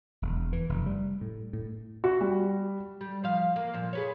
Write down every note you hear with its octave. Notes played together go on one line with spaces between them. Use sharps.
E1
E3
F1
G3
A2
A2
F#4
G3
G3
F3 F5
A#3
A#2 F3
G#4 B4 C#5